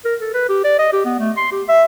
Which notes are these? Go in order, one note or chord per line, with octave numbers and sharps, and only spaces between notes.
A#4
A4
B4
G4
D5
D#5
G4
B3
A3
C6
G4
E5